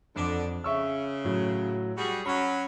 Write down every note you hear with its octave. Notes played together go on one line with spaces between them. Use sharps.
F2 D3 D4 D6
C#3 E5 C#6 E6
A2 F#3
G3 F#4 G#4
F#3 C#4 B5